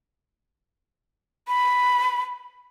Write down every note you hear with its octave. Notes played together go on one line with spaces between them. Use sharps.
B5